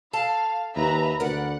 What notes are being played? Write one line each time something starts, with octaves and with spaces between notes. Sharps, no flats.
A4 F5 A5
D#2 B4 E5 A#5
D2 A#4 B4 D5 F#5